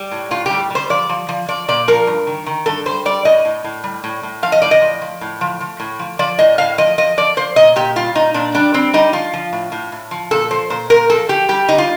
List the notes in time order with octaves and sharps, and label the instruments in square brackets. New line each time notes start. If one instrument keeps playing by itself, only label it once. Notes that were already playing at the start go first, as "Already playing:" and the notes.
Already playing: [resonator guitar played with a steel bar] G3
A2
A2 F4
G3 G4
G3 C5
F3 D5
F3
F3
F3 D5
A#2 D5
F3 A#4
G2
D#3
D#3
G2 A4
G3 C5
G3 D5
A2 D#5
A2
A2
G3
A2
A2
F3 F5
D#5
A2 D5
D#5
F3
F3
A2
F3
F3
A2
F3
F3 D5
A2 D#5
A2 F5
F3 D#5
F3 D#5
F3 D5
F3 C5
A#2 D#5
A#2 G4
G3 F4
A#2 D#4
A#2 D4
G3 D4
G3 C4
G3 D#4
F3 F4
F3
A2
A2
A2
F3
A#2 A4
F3 C5
A#2 C5
A#2 A#4
F3 A4
F3 G4
G3 G4
D3 D#4
F4